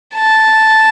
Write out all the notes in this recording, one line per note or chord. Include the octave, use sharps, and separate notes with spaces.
A5